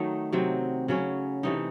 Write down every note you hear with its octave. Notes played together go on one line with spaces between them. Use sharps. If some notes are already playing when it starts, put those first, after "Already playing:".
Already playing: D#3 F#3 A3 D#4
C3 F#3 C4
C#3 F#3 C#4
C3 E3 A3 D#4